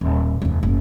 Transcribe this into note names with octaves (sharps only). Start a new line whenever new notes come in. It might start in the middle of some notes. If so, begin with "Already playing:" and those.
D#1
F1 D#2
F#1 D#4